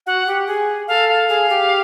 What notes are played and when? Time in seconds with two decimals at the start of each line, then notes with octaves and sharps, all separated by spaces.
0.06 F#4 F#5
0.27 G4
0.47 G#4
0.88 A4 F5
1.09 F5
1.29 G#4
1.49 G4